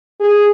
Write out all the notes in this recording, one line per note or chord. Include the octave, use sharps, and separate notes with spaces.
G#4